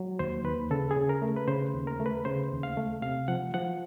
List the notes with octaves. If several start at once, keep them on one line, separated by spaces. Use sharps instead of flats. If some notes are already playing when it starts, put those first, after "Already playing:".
Already playing: F#3
D#2 C5
D#2 B4
C#3 A4
G#4
C#3
A#4
A3
B4
C#3 C5
D#2
A#4
A3
B4
C#3 C5
D#2
F5
A3
C3 F5
F3 F#5
F3 F#5